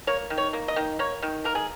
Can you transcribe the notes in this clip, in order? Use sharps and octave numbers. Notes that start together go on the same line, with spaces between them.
A#3 C#5
D#3
C#5
A#3
D#5
D#3
A#3 C#5
D#3
A#3 A#4
G#4